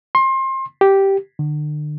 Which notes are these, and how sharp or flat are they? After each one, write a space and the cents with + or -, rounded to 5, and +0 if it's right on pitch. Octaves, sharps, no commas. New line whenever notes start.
C6 +30
G4 -5
D3 +35